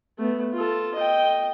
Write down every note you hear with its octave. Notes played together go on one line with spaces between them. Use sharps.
A3 B3
F4 A4
D#5 G5